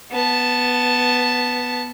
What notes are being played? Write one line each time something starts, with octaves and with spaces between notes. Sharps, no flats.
B3 A5